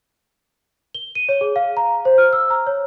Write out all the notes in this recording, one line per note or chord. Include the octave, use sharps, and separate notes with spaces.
G7
D#7
C#5
G#4
F5
A#5
C5
F6
E6
A#5
C#5